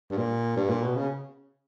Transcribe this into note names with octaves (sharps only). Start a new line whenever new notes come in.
G2
A#2
G2
A#2
B2
C#3